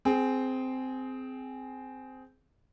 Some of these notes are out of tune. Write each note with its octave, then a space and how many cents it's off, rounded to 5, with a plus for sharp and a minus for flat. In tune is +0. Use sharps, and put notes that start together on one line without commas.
C4 -10 G#4 +15